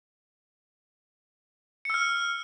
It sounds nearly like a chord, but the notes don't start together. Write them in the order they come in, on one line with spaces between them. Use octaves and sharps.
C#7 E6 F6